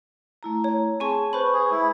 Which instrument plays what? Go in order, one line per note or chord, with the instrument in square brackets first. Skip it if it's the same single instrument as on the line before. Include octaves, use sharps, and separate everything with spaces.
[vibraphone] A3 E4 A#5
[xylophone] C#5
[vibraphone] C4 G#4 A5 [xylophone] G#5 C#6
[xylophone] B4 C5 B5 [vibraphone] C#6
[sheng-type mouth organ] G#4
[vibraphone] G#3 [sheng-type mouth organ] E4